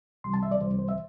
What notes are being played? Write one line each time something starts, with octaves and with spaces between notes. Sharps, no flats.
C2 C3 E3 G3 C6
A5
E5
D5
C2 C3 E3 G3 C5
C5
E5